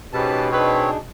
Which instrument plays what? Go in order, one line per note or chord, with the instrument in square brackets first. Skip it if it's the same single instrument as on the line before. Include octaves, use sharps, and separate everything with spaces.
[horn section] G#2 [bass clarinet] B2 [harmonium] C#4 G4 B4 [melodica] A5
[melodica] C4 C#5 [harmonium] D4 D#4 G#4 [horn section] B4